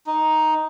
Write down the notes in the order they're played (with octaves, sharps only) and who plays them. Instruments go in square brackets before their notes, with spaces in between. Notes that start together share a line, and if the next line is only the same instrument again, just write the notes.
[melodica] D#4